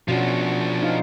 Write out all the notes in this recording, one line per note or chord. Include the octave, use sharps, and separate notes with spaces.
B2 F3 C#4 D4 F#4
D#4 C5 F5